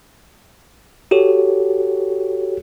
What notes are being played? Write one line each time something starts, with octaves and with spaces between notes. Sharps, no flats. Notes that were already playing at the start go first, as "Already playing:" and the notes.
F#4 G4 A4 C#5